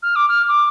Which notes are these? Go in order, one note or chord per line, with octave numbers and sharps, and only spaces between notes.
F6
D6
F6
D6